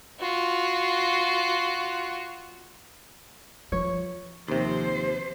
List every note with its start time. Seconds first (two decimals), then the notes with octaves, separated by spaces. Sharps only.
0.19 F4 F#4
3.72 F3 C#5
4.48 D#2 C3 F3 C5